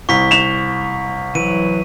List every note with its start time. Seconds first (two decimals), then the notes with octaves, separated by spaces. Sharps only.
0.09 C2 C#6 B6
0.31 E7 F7
1.35 E3 F#3 D#7